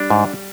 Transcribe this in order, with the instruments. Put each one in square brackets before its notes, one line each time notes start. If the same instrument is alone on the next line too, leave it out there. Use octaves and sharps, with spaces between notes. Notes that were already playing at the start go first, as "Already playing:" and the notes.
Already playing: [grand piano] G3 [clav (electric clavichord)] D4
[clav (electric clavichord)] G#2